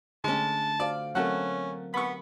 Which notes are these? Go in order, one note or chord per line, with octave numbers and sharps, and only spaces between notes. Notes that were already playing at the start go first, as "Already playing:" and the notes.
D3 G#3 A3 C#4 A5
F#4 C5 D5 F5
F#3 A3 C4 C#4 F#4 A#4 F#5
B3 B5 C#6